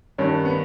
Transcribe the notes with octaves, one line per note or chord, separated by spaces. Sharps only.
G2 D#3 C#4
B3